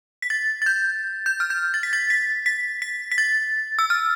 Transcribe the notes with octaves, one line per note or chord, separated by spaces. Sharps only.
B6
A6
A6
G6
G6
F6
G6
A6
B6
A6
B6
B6
B6
B6
A6
E6
F6